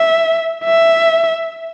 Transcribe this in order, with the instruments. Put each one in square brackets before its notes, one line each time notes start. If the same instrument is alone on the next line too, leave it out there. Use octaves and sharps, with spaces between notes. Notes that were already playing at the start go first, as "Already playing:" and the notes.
Already playing: [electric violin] E5
E5